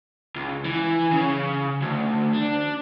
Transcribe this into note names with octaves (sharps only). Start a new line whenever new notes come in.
C#2
E3
C#3
D2
D4